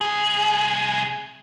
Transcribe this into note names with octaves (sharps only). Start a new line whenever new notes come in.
C2 G#4